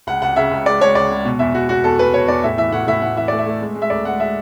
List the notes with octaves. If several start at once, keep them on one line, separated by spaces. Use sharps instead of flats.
C#2 F#5
C#2 F#5
C#3 E5
C#2
G#3 D5
G#3 C#5
C#2 D5
G#3
B2
E2 E5
E2 F#4
E2 F#4
E2 A4
E2 B4
B2 C#5
E2 D5
A2 E5
E3 E5
A2 F#5
A2 E5
A2 F#5
E3 E5
A3 D5
E5
A3
G#3
G#3
E5
D2 D5
G#3 F#5
G#3 E5